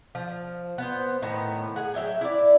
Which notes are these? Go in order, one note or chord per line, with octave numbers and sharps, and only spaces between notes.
F3
B3 C5
A2 D#3 B3 A#5
G#4 F#5
F#3 E5 G5 G#5
E4 D5